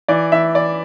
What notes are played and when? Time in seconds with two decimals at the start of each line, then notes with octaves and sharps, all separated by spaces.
0.08 E3 D5
0.32 E3 E5
0.55 E3 D5